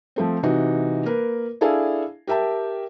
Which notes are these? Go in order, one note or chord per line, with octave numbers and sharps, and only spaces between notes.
F3 A3 C4
C3 E3 D#4 F#4
A#3 A#4 B4
D4 E4 G#4 A4 F5 G#5
G4 A#4 E5 G5 A5